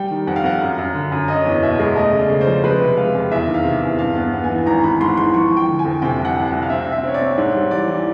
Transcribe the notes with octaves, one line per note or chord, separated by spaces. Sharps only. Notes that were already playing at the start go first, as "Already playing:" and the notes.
Already playing: G3 G5
D#3
F2 F#5
F5
F2 F#5
F#2
F#2
D3
F#2
C#4 D#5
E2
B2 E5
G#3
A3 D#5
C#3
D5
C#3
C5
F3
G#3 B4
C3
G#3 F5
F2
E2 E5
D#3
F5
C3
E2
G2 F5
B3
B3
G#5
E3
G#1 A#5
G#1 B5
G#2 C6
E3 C6
F3 C#6
F3
G5
D3
G#5
F2
C3 G5
C2
F#5
C2
C2 F#5
F5
C4 E5
C4
E5
C4 C#5
D5
C4
G#2 C#5
G3
E3 D5
E3